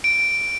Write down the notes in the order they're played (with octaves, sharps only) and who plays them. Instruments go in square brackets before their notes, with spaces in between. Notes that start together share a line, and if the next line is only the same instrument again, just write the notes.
[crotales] D7